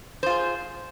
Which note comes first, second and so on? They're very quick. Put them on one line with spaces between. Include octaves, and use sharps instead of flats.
C5 F4 G#4